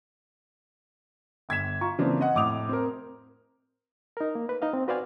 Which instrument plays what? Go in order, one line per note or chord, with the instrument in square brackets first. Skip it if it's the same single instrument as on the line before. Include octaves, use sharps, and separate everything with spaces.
[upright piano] G1 G#6 B6 E7
F4 A#5 C#6
C#3 E3 A#3 C4 D4
D#5 F#5
F1 A2 D6 D#6 F7
C4 A#4
[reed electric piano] D#4 A#4
A#3
B4
D#4 D#5 F5
C4
F#4 B4 C5 D5 F5 G#5